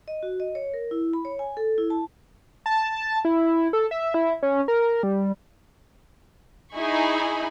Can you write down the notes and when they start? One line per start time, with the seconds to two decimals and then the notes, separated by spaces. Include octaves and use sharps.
0.08 D#5
0.23 F#4
0.40 D#5
0.55 C#5
0.74 A#4
0.91 E4
1.13 B5
1.25 C#5
1.39 G#5
1.57 A4
1.78 E4
1.90 A5
2.66 A5
3.25 E4
3.73 A4
3.91 E5
4.14 E4
4.43 C#4
4.68 A#4
5.03 G3
6.74 D#4 E4 G#4 G#5 B5 C#6